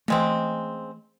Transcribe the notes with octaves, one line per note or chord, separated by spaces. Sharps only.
C#3 E3 G#3 A3 C4